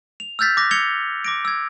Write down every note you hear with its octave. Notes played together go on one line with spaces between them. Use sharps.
F7
E6 F6 G6 A6 B6
D6 F#6 A#6
E6 G#6 C#7 F7 G7
D6 A#6 D7
E6 G#6